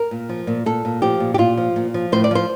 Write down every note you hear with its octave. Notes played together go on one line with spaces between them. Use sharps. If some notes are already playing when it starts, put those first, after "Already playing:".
Already playing: A#4
A#2
F3
A#2
A#2 A4
A#2
F3 G4
A#2
G4
A#2 F4
F3
A#2
F3
A2 C5
D5
F3 C5